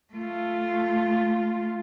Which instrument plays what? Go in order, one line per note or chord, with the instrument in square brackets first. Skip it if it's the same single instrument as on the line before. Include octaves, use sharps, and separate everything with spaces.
[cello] A3 F4